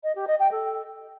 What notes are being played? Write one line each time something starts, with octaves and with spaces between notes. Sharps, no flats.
D#5
G4
D#5
G5
A4